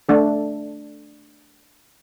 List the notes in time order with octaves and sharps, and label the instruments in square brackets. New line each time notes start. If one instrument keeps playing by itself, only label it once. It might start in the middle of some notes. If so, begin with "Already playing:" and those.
[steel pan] A3 D4 A4